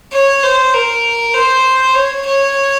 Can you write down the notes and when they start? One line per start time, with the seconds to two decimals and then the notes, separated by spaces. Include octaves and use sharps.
0.13 C#5
0.43 C5
0.74 A#4
1.34 C5
1.95 C#5
2.26 C#5